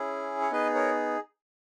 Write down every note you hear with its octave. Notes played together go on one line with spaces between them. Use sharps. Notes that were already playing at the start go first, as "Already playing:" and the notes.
Already playing: C#4 E4 G#4
C#5
B3 D#4 G#4 B4 D#5
A#4 C#5